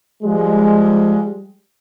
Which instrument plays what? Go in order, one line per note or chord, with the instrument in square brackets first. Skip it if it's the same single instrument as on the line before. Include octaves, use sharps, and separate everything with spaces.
[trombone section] F3 G3 G#3